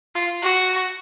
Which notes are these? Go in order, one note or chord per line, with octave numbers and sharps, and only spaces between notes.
F4
F#4